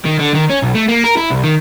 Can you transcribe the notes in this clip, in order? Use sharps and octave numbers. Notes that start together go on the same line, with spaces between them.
D#3
D3
D#3
C#4
B1
A3
A#3
A#4
E4
C2
D#3